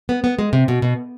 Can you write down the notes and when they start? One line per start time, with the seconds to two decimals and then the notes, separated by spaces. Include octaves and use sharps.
0.09 B3
0.24 B3
0.39 G#3
0.53 C3
0.68 B2
0.82 B2